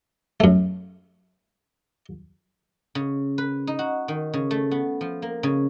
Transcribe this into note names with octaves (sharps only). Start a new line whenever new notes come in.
F#2 A3
C#3
B4
D#4
F#4
D#3
C#3
A3
B3
F3
A#3
C#3